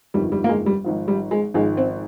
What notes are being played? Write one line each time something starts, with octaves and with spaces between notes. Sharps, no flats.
G1 F2 D#3 G3
G3
A#3
G#3
G3
G#1 G#2 F3
G3
G#3
G#1 G#2 F3 G#3
C4